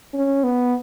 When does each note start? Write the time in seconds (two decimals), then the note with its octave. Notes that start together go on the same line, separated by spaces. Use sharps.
0.14 C#4
0.44 B3